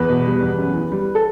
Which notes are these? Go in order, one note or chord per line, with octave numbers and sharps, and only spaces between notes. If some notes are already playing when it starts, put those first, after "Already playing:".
Already playing: E2 B4
B2
G3
E2
F#2
E3
G3
A4